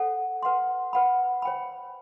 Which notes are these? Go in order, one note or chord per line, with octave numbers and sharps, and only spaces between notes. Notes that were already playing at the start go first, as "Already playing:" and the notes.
Already playing: A4 C5 F#5
B4 F#5 C6
B4 F#5 B5
C5 G5 B5